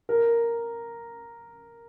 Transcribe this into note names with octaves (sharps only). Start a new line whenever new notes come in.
A#4